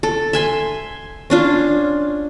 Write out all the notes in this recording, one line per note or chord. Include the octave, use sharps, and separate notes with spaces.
A4
E5 G#5 C6
C#4 D4 F4